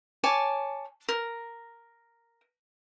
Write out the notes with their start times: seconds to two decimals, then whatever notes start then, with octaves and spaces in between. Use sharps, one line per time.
0.24 C#5 G#5 A5 D6
1.09 A#4